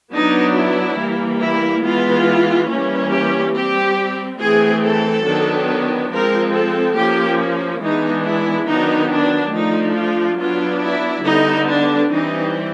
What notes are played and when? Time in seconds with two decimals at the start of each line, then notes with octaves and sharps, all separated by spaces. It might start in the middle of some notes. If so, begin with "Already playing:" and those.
0.11 F#3 B3 D4 D#4
0.55 E4
0.98 E3 G3 A#3
1.40 E4
1.83 E3 G#3 B3 F4
2.68 E3 G3 A#3 C#4
3.11 G4
3.54 G3 C4 G4
4.39 E3 A3 C4 G#4
4.82 A4
5.25 D#3 F#3 B3 D4
6.11 F3 G#3 C4 A#4
6.53 A4
6.96 F3 A#3 C#4 G4
7.81 E3 G#3 B3 D4 D#4
8.24 E4
8.67 D#3 F#3 B3 D4 D#4
9.11 D4
9.53 F3 A3 D4 D#4
9.95 F4
10.39 F#3 B3 D4 F4
10.81 E4
11.24 D3 G3 B3 D#4
11.67 D4
12.10 E3 G3 C4 D#4